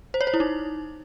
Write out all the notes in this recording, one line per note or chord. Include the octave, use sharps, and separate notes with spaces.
C5
C#5
C5
E4
D#4